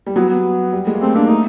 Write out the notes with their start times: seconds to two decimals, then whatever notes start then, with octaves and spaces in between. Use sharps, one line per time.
0.07 G3
0.16 F#3 B3
0.30 B3
0.73 G3
0.87 G#3
0.94 A#3
1.01 A3 C4
1.15 A#3 D4
1.28 A3 D#4